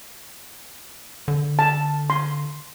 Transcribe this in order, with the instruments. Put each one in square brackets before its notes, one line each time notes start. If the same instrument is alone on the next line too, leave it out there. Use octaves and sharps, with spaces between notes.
[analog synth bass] D3
[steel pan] A5
C6